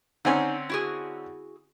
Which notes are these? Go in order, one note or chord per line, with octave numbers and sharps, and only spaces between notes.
D3 C4 C#4 D#4 G#5
E4 F#4 G#4